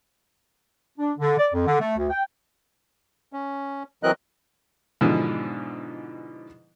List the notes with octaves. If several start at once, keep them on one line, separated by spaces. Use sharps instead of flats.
D4
D3
D5
F2
D3
A3
D2
G5
C#4
E3 F#3 C4 A#4 D#5 F#6
G#2 B2 D3 E3 F3